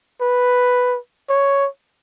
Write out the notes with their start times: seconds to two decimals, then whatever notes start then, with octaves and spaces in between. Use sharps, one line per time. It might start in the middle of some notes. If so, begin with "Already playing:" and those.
0.21 B4
1.29 C#5